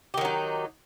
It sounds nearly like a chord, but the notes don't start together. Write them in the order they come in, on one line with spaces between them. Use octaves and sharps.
G4 D#3 F#3 D#4